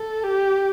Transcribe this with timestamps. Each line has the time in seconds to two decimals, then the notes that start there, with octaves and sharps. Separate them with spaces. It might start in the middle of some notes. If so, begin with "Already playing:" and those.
Already playing: A4
0.24 G4